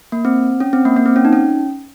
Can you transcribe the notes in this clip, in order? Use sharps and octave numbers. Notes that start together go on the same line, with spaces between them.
A#3
C4
C#4
C4
A#3
A#3
C4
C#4
D#4
C#4